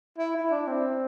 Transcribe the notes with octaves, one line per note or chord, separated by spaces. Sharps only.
E4
E4
D4
C4